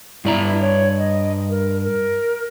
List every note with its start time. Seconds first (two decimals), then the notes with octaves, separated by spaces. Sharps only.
0.25 G2 E4 D5 A#5
0.61 C#5
0.98 D#5
1.50 A#4
1.84 A#4